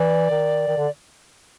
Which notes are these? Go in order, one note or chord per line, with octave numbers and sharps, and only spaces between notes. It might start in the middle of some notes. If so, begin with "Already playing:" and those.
Already playing: E3 D5
D#3
D#3
D3